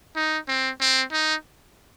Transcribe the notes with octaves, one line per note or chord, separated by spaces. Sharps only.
D#4
C4
C4
D#4